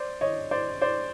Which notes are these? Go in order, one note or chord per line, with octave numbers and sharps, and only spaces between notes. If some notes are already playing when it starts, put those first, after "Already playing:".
Already playing: C5 D5
C#5 D#5
C5 D5
C5 D5